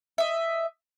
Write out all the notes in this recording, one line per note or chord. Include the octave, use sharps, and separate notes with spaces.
D#5 E5